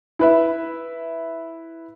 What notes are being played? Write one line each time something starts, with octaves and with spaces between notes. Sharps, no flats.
E4 B4 E5